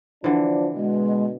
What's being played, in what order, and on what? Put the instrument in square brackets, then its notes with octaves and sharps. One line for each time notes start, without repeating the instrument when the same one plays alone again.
[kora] D3 E3 [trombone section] F3 D4
[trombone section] B2 [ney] G#3